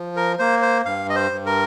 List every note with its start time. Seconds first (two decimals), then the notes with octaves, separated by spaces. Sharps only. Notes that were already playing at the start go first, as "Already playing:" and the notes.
Already playing: F3
0.16 A#4
0.39 A#3 C5
0.62 C5
0.86 G2 F5
1.09 D#5
1.16 C5
1.32 G2
1.46 A#4